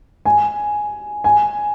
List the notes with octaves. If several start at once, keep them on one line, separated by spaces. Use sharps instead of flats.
G#5
G#5